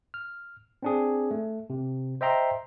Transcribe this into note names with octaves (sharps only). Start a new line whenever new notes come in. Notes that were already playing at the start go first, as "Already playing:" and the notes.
F6
C4 D4 G#4
A3
C3
C5 D#5 E5 G5 A#5 C6